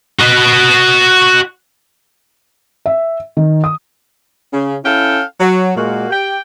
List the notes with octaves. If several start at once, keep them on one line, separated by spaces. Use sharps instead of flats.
F#4 D#5
E5
D#3
D#6
C#3
C#4 E4 A4 F5 G5
F#3
A#2 G#3 A#3 F#4
G4 G5